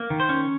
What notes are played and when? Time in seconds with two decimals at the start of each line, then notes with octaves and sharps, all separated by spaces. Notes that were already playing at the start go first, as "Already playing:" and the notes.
Already playing: A#3
0.10 D#3
0.20 C5
0.29 C#4